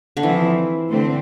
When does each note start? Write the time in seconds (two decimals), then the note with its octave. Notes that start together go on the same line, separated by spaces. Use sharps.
0.17 D3
0.23 E3 F3 C4 E4
0.90 D3 A3 C4